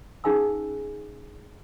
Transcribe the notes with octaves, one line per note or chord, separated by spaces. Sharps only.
C#4 D#4 G#4 F5 G#5 E6